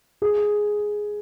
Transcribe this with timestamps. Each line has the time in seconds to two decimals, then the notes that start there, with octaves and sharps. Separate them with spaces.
0.22 G#4